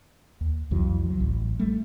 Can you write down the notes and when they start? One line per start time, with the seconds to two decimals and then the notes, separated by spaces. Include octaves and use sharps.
0.41 D#2
0.71 C2 F2 E3 F#3
1.09 C#2 F#3
1.20 A1
1.59 G3 A3